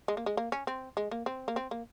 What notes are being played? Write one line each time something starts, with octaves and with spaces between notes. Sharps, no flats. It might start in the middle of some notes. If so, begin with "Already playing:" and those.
G#3
A#3
G#3
A#3
C#4
C4
G#3
A#3
C4
A#3
C4
A#3